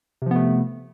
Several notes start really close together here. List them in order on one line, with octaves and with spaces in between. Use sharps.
C3 F3 B3 A3